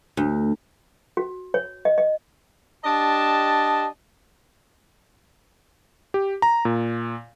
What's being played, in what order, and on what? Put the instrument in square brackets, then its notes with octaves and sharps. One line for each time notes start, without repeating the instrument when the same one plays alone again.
[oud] D2
[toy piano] F#4
C#5
D#5
D#5
[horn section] D4 G4 D#5 A5
[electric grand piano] G4
A#5
A#2